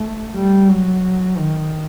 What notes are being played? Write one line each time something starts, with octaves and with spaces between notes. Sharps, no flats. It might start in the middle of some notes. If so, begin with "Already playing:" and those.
Already playing: A3
G3
F#3
D#3